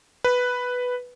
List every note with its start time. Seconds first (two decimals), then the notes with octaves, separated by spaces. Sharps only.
0.24 B4